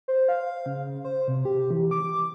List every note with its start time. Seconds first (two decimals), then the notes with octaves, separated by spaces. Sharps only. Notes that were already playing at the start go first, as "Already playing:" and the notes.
0.08 C5
0.29 F5
0.66 C#3
1.05 C5
1.28 C3
1.45 G4
1.71 E3
1.91 D6